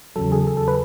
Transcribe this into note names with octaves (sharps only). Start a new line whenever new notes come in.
E2 C#3 F#3 A4
G#4
A4
A4
B4